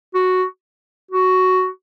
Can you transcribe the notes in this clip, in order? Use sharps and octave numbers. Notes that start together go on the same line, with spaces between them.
F#4
F#4